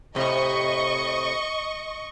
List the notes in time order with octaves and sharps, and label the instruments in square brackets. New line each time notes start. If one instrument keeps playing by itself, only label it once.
[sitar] A2 C3 [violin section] D#5 C#6